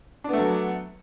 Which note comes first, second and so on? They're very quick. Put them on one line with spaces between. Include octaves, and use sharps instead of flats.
D4 B3 A3 F#3